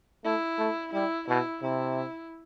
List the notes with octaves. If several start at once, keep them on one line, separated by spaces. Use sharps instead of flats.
A3 E4
A3
G3 E4
B2 E4
C3 E4